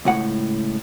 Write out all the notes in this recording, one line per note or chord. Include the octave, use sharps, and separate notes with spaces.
C#2 A2 F#5